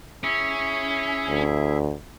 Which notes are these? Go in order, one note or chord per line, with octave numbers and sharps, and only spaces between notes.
C#4 E4 G#4 E5
D2